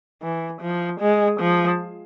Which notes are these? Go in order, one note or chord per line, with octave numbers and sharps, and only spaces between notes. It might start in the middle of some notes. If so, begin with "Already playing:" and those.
E3
F3
G#3
F3